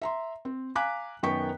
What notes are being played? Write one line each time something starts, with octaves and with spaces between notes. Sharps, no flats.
E5 A#5 C6
C4
F5 G#5 A#5 D6 F#6 B6
F#2 D#3 B3 G5 C#6 B6